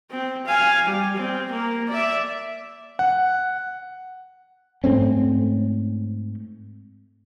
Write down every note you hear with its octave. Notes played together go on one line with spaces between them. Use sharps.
C4
F5 G#5
G3
C4
A#3
D5 E5
F#5
G#2 A3 C4 C#4